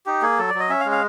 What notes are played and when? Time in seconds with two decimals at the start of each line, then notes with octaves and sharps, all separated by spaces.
0.06 D#4 G4
0.22 A#3 G#4
0.39 F#3 A4
0.49 D5
0.55 F#3
0.60 D#5
0.69 C#4 E5
0.81 F5
0.85 G#3
0.92 F5